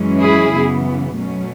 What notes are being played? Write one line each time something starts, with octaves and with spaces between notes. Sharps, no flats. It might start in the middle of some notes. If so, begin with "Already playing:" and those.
Already playing: F#2 E3 G#3 C#4
E4 G#4
F#2 C#3 E3 B3
B2 F#3 A3 C#4